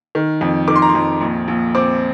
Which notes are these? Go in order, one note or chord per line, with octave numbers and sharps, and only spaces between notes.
D#3
F2
D#3 D6
C6
A#5
C6
F2
A#1
A#1
C4 D6